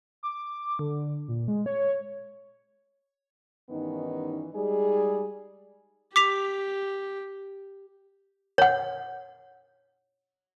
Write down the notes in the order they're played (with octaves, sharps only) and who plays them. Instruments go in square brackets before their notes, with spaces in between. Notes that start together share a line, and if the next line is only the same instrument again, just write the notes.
[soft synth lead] D6
D3
A#2
G#3
C#5
[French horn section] G2 D#3 E3 B3 C#4 D#4
G3 G#3 D#4 G#4
[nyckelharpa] G4 [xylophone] D6 B6 F7
[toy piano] C#5 F#5